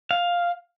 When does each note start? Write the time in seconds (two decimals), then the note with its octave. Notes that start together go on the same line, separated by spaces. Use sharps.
0.11 F5